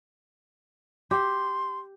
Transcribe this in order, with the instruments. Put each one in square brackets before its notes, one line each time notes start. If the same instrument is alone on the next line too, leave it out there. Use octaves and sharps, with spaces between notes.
[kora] G4 [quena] C6